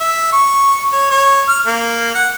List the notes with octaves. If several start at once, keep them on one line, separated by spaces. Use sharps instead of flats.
E5
C#6
C#5
C#5
F6
A#3
F#5